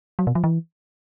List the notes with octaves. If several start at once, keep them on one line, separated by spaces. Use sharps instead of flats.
F#3
B2
F3
E3